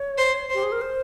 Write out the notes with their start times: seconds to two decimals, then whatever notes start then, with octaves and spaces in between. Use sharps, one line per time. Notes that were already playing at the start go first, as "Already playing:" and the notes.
Already playing: C#5
0.18 C5
0.50 G4 C5
0.63 G#4
0.72 A#4
0.81 C5